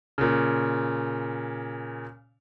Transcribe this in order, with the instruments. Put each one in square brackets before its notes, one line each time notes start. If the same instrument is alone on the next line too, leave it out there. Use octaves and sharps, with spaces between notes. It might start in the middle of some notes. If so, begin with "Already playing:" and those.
[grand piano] A#2 C#3